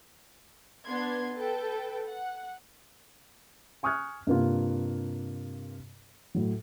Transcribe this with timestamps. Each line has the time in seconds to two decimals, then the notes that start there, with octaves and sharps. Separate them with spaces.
0.85 B3 D4 C6 G#6
1.35 A4 B4 G5
2.09 F#5
3.83 G#5 C#6 D#6 F6 F#6 G#6
4.27 G2 C3 A#3 F4
6.35 A2 F#3